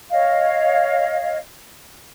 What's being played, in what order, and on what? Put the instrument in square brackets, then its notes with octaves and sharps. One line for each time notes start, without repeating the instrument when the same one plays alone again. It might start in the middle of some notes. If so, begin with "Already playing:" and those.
[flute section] C#5 D#5 F5